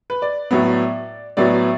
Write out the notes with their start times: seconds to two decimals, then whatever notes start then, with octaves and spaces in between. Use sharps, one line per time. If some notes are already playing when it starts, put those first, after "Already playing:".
0.10 B4
0.22 D5
0.51 A2 F#3 B3
1.37 A2 F#3 B3 D5